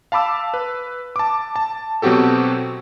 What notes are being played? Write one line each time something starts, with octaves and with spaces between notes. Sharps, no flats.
F5 A5 B5 D6 E6
B4
A5 D6
A5
B2 F#3 C4 F#4 G4 A4